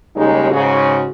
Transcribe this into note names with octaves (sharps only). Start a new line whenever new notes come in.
D#2 C#3 G3 G#3 D#4
G#2 C#3 F#4